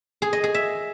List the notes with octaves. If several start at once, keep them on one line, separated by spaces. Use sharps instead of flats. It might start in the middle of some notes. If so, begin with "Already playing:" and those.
G#4
D#5
G#4
E5